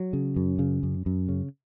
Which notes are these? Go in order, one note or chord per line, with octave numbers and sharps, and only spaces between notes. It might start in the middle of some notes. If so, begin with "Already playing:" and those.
Already playing: F#3
C#3
F#2
C#3
F#2
F#2
C#3